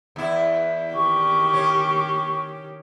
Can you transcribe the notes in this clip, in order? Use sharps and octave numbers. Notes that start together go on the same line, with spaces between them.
E2 E4
D#3 G4 C#6
C#4